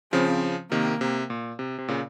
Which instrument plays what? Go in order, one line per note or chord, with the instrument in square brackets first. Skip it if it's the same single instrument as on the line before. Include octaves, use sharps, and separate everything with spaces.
[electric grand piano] C#3 F3 [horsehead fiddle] C4
[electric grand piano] C3 D#3 [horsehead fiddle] A#3
[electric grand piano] C3
A#2
C3
C3
A#2 C#3